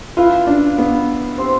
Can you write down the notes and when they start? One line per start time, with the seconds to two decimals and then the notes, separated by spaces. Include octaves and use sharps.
0.17 E4 F4 B4 F5
0.47 D4
0.78 B3
1.38 C4 G4 C5